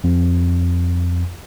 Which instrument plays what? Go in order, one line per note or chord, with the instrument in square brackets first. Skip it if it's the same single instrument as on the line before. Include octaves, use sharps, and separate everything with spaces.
[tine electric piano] F2